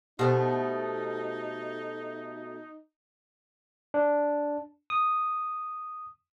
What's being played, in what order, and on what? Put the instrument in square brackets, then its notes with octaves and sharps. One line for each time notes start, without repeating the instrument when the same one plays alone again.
[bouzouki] B2 A3 [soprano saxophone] D#4 [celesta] G4 C5
[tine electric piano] D4
D#6